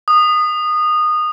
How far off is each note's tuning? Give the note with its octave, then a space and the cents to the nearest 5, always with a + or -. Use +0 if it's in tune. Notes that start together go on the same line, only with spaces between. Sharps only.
D#6 -20